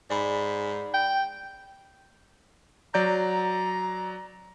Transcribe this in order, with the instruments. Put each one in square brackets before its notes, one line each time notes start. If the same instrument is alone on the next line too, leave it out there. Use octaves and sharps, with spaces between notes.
[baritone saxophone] G#2 [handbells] D5 B5
[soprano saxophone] G5
[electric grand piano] F#3 D5 G6 [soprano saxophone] A#5